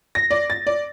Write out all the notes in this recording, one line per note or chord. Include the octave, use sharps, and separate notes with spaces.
A#6
D5
A6
D5